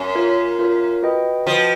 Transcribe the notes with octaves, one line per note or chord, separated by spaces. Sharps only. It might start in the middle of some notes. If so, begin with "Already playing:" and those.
Already playing: F#2
F4 A#4 C#5
F4 A#4 C#5
F#4 B4 D#5 G5
F3 F#4 B4 D#5 G5